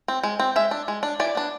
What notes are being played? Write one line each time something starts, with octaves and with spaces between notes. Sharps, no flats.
C4
G#3
C4
G#3 E5
D4
G#3
D4
E3 D5
B3 D4